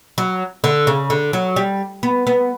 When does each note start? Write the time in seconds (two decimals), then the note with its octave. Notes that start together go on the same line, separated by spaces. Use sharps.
0.18 F#3
0.64 D3
0.87 C#3
1.10 D3
1.33 F#3
1.56 G3
2.03 B3
2.27 B3